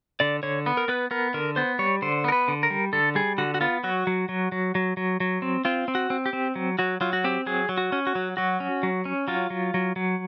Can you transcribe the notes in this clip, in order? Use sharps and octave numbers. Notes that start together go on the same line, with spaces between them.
D3 D5
D3 C#5
B3
A#4
B3 B4
B3 A#4
D3 A#4
B3 C5
G3 C#5
D3 C5
B3 A#4
B4
D3
A#4
G3
D3 A4
G3 G#4
D3 F#4
F#4
B3 F4
F#3 F#4
F#3
F#3
F#3
F#3
F#3
F#3
C4
C4 F4
C4
F#4
C4
G4
C4
F#3
F#3 F#4
F#3 F4
F#4
C4 G4
F#3 G#4
F#3
F#4
C#4
F#4
F#3
F#3 F#4
C#4
F#3
C#4
F#3 F4
F#3
F#3
F#3